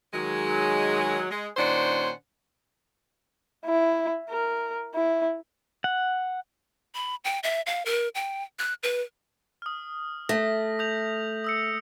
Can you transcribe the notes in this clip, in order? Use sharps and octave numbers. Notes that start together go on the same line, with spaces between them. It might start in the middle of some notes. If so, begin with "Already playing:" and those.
D#3 F#3 G#3
G#3
A#2 D#3 C#4 D4 C5 F#5
E4
A#4
E4
F#5
B5
G5
E5
F5
A#4
G5
F#6
B4
D#6 F6
A3 A#6 B6
D#6 G6 F7
D#6 E6 C#7